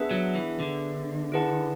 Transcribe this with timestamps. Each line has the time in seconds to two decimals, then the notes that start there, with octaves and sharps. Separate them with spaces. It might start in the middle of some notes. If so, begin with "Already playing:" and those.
Already playing: B3 D4 G#4 B4 E5
0.11 F#3
0.35 E3
0.60 D3
1.32 E4 G#4 B4 F#5 A5